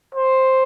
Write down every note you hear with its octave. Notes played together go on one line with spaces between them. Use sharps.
C5